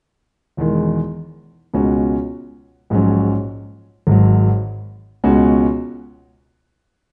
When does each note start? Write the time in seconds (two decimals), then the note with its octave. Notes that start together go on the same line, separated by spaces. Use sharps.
0.57 E1 E2 D#3 G#3
1.74 C#2 B2 G#3 C#4 F#4
2.90 A#1 G#2 F#3 C#4
4.07 G#1 G#2 F#3
5.24 C#2 B2 G#3 C#4 F#4